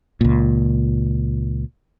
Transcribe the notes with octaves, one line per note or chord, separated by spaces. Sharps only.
C#2 A#2